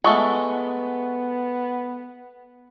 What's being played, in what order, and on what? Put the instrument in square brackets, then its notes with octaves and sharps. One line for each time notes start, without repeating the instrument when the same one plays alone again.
[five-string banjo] G#3 A3 [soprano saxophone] B3 [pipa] F#5 C#6